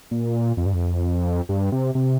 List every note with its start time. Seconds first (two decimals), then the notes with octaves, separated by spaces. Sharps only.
0.11 A#2
0.57 F2
0.66 G2
0.74 F2
1.49 G2
1.72 C3
1.95 C3